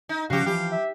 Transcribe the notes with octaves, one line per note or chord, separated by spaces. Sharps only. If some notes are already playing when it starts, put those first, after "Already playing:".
D#4
C#3 F3 F#4 G4 F5
E3 F3 G4 G#5
E5